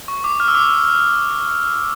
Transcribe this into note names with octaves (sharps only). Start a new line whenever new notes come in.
C#6
D6
F6
E6
D6
E6